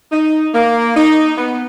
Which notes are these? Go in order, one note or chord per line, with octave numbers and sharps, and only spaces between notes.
D#4
A#3
D#4
B3